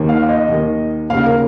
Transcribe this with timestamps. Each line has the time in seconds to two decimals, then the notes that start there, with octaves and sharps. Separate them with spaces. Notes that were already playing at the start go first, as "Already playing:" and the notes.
Already playing: D#2 D#3
0.09 F5
0.29 D#5
0.49 D#2 D#3
1.10 D#2 C#3 F5
1.26 A#4